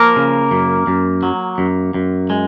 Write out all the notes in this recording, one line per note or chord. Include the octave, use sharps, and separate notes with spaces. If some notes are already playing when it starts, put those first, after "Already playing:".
Already playing: F3 A#3 A#4
C#3
F#2
F#2
F#3
F#2
F#2
G#3